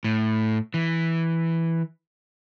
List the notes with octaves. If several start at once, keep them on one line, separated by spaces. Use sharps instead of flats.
A2
E3